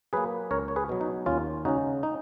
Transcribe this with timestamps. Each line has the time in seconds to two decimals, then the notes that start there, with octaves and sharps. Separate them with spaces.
0.13 F#3 A#3 G#4 B4
0.51 C#2 A#4 C#5
0.68 C#5
0.76 G#4 B4
0.89 B2 F#3
1.01 D#4
1.26 D#2 C#4 F4
1.65 C#3 G#3 C#4 D#4 F#4
2.03 D#4